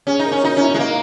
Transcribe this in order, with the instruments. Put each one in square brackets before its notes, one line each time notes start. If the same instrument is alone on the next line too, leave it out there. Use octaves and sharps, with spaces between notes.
[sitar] C#4 [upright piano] G#4
[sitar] D#4
[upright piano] A#4
[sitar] C#4
[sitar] D#4 [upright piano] F#4
[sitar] C#4 [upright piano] E4
[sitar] G#3
[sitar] A#3 [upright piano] D#4